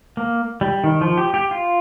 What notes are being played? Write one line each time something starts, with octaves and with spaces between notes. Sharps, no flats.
A#3
G3
D#3
F3
G4
G4
F4